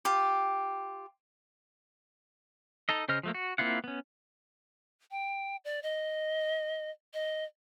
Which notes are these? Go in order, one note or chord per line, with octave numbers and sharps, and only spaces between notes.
F4 G4
D#4 A4 D#5
C#3 C5 D#5 F6
F3 A3 A#3
F#4
A#3 C4 E4 F4 F#5
B3 C#4
G5
D5
D#5
D#5